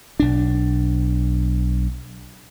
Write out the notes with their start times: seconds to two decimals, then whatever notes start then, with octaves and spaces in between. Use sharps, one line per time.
0.20 B1 D4